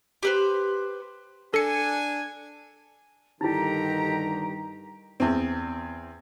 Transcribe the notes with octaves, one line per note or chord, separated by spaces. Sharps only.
G4 B4 C5
D4 A4 G#5 C#7
G2 D3 D#3 D#4 E4 G4 A#5
E2 C4